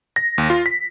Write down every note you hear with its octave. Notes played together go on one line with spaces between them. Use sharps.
A#6
D#2
F4
B6